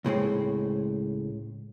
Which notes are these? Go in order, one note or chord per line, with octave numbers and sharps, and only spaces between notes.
C#2 A2 G#3 C4